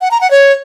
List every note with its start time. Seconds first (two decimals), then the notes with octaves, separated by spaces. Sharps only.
0.01 F#5
0.11 A#5
0.21 F#5
0.31 C#5